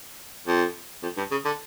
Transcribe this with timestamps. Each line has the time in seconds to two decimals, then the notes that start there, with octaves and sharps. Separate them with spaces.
0.47 F2
1.03 F2
1.17 G2
1.31 C#3
1.45 D3